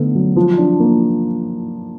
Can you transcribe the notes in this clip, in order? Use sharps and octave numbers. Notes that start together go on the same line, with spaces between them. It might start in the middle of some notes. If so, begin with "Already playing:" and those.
Already playing: D3 A3 B3
F#3
F3
D4
A#3